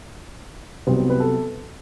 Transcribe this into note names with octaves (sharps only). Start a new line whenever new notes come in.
C2 C3 F#3 B3 C4 C5
B4
A4